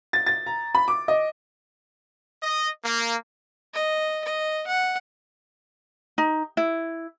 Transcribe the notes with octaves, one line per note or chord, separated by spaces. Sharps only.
A6
A6
A#5
B5
D6
D#5
D#5
A#3
D#5
D#5
F#5
D#4
E4